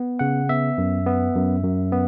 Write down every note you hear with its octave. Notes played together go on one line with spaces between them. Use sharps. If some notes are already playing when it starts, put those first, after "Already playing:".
Already playing: B3
C#3 F#5
B3 E5
F#2
B3
F#2
F#2
B3